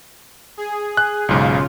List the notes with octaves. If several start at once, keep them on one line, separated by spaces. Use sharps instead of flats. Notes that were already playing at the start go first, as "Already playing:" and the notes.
G#4
F#6
B1 G#2 C#3 F4